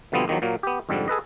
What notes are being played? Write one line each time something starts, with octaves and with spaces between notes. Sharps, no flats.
B2 D3 F3 G3 B3 C4
E2 D#3 F3 F#3
A#2 F#3 A#3
B3 G4
F2 G#2 D3 G3
G#4 A4 B4 D#5